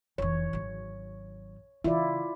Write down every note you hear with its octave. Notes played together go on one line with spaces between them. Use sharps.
F1 E3 C#5
G#1 F#3
C#3 E3 E4 F4 D5